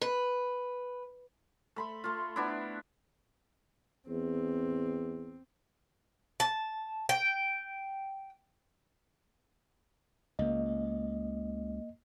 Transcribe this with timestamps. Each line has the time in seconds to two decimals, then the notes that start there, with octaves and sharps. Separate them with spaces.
0.02 B4
1.76 A3 B5 C6
2.04 A3 F4
2.36 B3 D4 E4
4.09 E2 C4
6.40 A5
7.09 G5
10.39 C#2 A#3 D#5